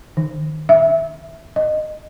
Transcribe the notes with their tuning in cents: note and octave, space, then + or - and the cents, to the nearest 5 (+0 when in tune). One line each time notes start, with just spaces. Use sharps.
D#3 -10
E5 +0
D#5 -15